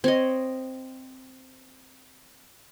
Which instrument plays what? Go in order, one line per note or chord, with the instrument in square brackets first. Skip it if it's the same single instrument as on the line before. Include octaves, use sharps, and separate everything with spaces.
[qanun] C4 C#5 D#5